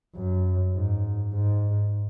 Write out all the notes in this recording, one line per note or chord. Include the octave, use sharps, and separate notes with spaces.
F#2
G#2
G#2